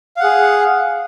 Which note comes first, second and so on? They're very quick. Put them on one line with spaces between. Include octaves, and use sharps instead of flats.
F5 F#5 G#4